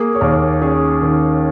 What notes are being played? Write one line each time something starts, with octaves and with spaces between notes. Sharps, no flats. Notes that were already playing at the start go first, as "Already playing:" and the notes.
Already playing: A#3 G#4
C#5
D#2 A#4
C#4 G#4 C#5
D#3